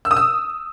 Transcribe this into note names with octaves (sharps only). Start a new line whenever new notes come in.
E6
D#6
E6